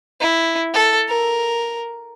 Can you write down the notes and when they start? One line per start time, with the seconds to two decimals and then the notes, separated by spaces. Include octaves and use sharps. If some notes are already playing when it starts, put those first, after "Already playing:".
0.21 E4
0.73 A4
1.09 A#4